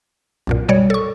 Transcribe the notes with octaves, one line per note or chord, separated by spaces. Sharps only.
B1 F#2 A#2
B2 G3 C#5 D5
A4 C#6